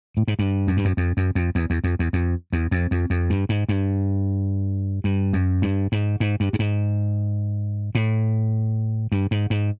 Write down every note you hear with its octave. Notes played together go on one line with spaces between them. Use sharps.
A2
G#2
G2
F#2
G2
F#2
F2
F#2
F2
E2
E2
F2
E2
F2
E2
F2
F2
F2
G2
G#2
G2
G2
F#2
G2
G#2
G#2
G2
G2
G#2
A2
G2
G#2
G#2